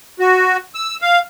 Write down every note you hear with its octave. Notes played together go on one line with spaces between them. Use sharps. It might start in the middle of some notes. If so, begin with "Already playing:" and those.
F#4
E6
F5